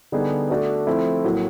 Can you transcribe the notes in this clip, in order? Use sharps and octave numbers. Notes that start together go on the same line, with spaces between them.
D3 G3 B3 D#4 G#4
A3 D4 F#4 A4 D5
F3 A3 C4 E4
A2 F#3 A#3